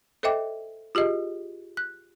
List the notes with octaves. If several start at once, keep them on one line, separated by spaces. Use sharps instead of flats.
A4 C5 D#5 E5 G5 D6
F4 G4 G#4 D#5
F#6